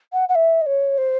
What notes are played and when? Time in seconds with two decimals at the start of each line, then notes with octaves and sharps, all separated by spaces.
0.13 F#5
0.29 F#5
0.35 E5
0.61 D#5
0.66 C#5
0.98 C5